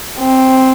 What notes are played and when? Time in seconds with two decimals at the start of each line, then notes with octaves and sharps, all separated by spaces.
0.19 C4